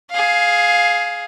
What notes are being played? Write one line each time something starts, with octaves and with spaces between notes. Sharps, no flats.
G#4 F5